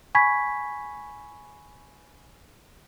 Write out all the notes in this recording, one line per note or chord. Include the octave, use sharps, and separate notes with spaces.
G#5 B5 C#6 G#6 B6